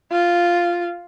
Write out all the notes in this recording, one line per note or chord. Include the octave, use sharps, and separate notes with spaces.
F4